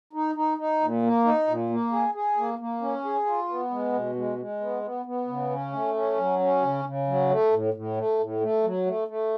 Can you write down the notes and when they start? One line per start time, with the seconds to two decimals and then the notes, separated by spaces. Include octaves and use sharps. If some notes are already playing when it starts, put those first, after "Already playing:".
0.13 D#4
0.35 D#4
0.58 D#4
0.80 A#2
1.02 A#3
1.25 D#4
1.47 A#2
1.70 A#3
1.92 G#4
2.14 G#4
2.37 A#3
2.59 A#3
2.82 C#4
3.05 G#4
3.26 F4
3.49 B3
3.71 G#3
3.93 B2
4.15 G#3
4.38 G#3
4.60 B3
4.83 B3
5.06 B3
5.27 C#3
5.51 C#4
5.72 A3
5.94 C#4
6.18 F#3
6.39 C#4
6.62 C#3
6.85 C#3
7.07 F#3
7.29 A3
7.51 A2
7.74 A2
7.97 A3
8.19 A2
8.41 A3
8.64 F#3
8.86 A3
9.08 A3